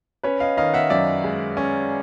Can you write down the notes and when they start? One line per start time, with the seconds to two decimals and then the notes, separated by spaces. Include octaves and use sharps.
0.23 C#4 B4 C#5
0.40 D#5 F5
0.57 D#3 D#5 F5
0.74 E5 F#5
0.90 F#2 D5 E5
1.24 G#3
1.57 C#4